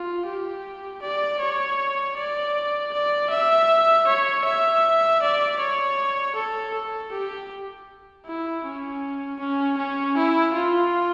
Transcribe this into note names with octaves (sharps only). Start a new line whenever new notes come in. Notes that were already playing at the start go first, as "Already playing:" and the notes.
Already playing: F4
G4
D5
C#5
D5
D5
E5
C#5
E5
D5
C#5
A4
A4
G4
E4
C#4
C#4
C#4
E4
F4